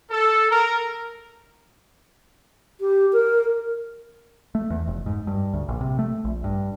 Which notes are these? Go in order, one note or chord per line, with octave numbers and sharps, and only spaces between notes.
A4
A#4
G4
A#4
A3
E2
F1
G#2
G2
D2
A#1
C3
A3
A#1
G2